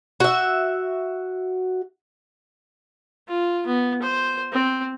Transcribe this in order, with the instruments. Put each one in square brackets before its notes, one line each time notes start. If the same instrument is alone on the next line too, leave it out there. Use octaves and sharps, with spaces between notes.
[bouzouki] F#4 E5
[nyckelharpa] F4
B3
C5
C4